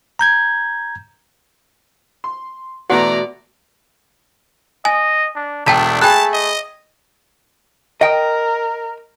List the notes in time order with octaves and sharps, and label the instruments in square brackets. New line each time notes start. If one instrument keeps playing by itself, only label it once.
[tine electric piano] A#5 G6 G#6
[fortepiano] C6
[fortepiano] B2 A3 F#5 [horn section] E3 A#5 [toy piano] F#4 [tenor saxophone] D5
[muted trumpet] D#5 [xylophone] G#5
[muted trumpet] D4
[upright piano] E1 B6 [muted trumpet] A3 [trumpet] D4 [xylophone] G5 A5 A#5
[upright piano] G#4 B5 [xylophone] G5 F#6 [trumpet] A5
[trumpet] D#5
[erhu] A#4 [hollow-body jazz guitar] D#5 G5